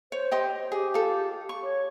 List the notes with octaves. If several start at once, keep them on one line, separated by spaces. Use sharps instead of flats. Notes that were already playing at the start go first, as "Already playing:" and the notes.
C5 C#5
G4 D#5 C6
G4 G#4
F4 A4
C#6
C#5